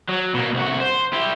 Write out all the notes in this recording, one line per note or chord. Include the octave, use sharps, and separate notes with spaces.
F#3
B2 A#3
C2 F#4
C5
E4 G4